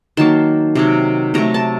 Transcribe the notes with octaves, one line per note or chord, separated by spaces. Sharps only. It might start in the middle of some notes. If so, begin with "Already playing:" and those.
D#3 F#3 A#3 A5
C3 D#3 F#3
C3 F#3 A3 A#5
A5